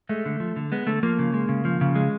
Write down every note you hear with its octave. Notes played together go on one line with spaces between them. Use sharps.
G#3 A3
D3
F3
D3
G#3 B3
D3 A3
F3 A#3
C#3
G#3
C#3
F3
C#3
G#3